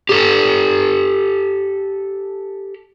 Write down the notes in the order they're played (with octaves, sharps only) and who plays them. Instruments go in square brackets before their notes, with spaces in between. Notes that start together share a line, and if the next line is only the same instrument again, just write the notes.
[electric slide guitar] G4 A4